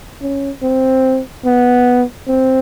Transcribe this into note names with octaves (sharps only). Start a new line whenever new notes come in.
C#4
C4
B3
C4